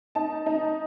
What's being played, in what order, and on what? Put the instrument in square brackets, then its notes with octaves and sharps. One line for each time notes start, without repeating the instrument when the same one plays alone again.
[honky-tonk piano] D#4 A5
D#4